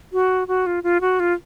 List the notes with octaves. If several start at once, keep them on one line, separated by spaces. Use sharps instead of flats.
F#4
F#4
F4
F4
F#4
F4